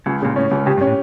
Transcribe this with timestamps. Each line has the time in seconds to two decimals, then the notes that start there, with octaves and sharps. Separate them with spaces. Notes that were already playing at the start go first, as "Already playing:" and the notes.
0.06 C#2 C#3
0.22 A#2 C#3
0.36 A2 C#4
0.51 C#2
0.66 C#3 G4
0.77 G2
0.81 C#4
0.87 A2